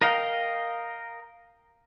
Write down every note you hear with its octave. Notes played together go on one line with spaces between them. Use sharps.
A#4 D#5 F5 G5